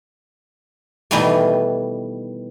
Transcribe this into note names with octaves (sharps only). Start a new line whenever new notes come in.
B2 D#3 E3 G3 A3